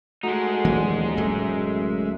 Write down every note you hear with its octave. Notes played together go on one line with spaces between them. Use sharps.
G#3 A3 D#4 F#4
D#1 E3 F#3 A#3
D1 F#2 A2 A3 E5